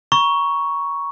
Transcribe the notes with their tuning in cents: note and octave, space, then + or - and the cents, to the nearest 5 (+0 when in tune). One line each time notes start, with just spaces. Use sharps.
A#5 +30 C#6 +5